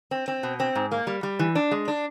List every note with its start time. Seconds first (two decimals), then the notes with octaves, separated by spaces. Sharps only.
0.11 C4
0.28 C4
0.43 B2
0.60 C4
0.75 G#2
0.92 A#3
1.07 G3
1.23 G3
1.39 E3
1.55 D4
1.71 G#3
1.88 D4